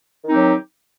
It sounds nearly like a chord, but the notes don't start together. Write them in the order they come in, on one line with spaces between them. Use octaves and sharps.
D#3 D#4 C4 G4 F#3